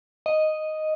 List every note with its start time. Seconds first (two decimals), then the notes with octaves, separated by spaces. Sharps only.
0.26 D#5